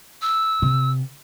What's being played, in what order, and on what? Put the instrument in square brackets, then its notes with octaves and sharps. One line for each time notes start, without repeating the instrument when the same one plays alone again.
[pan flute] E6
[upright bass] C3